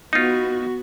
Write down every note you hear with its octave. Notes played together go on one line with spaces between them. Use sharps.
B3 D#4 F4 F#4